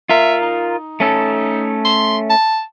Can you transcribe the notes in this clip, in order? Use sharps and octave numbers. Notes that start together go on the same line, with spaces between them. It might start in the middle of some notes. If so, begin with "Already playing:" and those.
F4 A#4 E5
D#4
A3 C#4 A4
C6
A5